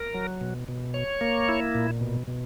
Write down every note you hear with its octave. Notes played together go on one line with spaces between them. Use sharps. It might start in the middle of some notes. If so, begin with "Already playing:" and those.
Already playing: A#4
F#3
B2
B2
C#5
A#3
E4
A#2
B2
B2